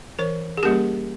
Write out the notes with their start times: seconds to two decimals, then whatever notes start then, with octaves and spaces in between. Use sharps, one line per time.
0.19 E3 A#4 C#5
0.57 G#4
0.63 G3 A#3 C#4 G4 A#4